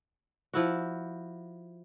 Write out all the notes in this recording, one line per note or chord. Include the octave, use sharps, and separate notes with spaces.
F3 E4 F#4